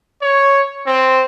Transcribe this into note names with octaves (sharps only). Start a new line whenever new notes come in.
C#5
C4